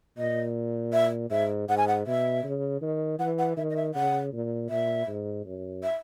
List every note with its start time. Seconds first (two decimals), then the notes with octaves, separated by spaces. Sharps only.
0.18 A#2 D#5
0.93 E5
1.30 G#2 E5
1.69 G#2 F#5
1.78 G#5
1.88 F#5
2.06 B2 E5
2.44 C#3
2.81 D#3
3.19 E3 F#5
3.39 F#5
3.57 D#3 E5
3.70 D#5
3.76 E5
3.94 C#3 F#5
4.32 A#2
4.70 A#2 E5
5.07 G#2
5.45 F#2
5.83 E5